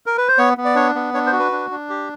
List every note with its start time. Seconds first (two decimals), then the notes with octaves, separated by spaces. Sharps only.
0.06 A#4
0.18 B4
0.28 C5
0.38 B3 C#5
0.58 B3
0.65 D5
0.75 D4 C#5
0.95 B3
1.14 D4 C#5
1.27 C5
1.32 F#4
1.39 B4
1.52 D4
1.71 D4
1.90 G4